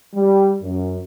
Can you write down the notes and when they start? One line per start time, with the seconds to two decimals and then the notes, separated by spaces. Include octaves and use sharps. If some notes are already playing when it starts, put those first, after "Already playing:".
0.14 G3
0.63 F#2